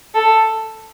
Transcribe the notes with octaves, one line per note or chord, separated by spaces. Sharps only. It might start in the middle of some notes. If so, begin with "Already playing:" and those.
A4